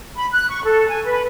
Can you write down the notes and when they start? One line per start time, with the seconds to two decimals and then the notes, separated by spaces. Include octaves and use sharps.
0.17 B5
0.32 F#6
0.48 C#6
0.64 A4
0.88 G#5
1.04 B4